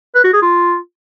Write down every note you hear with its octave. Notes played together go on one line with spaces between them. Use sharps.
B4
F#4
G#4
F4